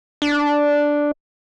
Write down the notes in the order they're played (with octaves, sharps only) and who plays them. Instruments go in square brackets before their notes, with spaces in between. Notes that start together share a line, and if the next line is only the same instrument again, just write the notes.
[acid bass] D4